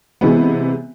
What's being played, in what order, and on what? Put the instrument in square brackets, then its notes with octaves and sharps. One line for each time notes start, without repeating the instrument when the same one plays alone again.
[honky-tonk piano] C3 E3 G#3 B3